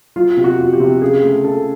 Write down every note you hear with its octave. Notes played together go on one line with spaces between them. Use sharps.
F#3 F4
C3
F#4
F2
G4
C3
C#3 G#4
A3
C#3 A4